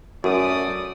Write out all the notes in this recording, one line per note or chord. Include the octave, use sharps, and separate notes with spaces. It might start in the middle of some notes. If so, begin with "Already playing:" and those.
F#2 A3 F#4 A#4 D5 D#6